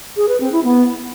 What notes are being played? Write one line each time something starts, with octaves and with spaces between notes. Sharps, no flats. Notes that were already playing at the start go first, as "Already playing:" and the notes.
G#4
B4
C4
E4
B3